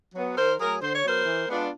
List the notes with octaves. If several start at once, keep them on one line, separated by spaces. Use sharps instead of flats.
F#3 B3
D#3 A#4 C5
F#3 A3 G#4 A#4
D3 C5
C#5
F#3 B3 A#4 C5
E3
G#3 B3 D4 F4